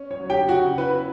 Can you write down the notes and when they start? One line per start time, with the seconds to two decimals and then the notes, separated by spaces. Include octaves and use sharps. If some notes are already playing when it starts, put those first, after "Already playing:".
Already playing: C#4
0.11 C#5
0.20 F#3
0.30 G4 G5
0.48 C#3 F#4 F#5
0.78 E4 B4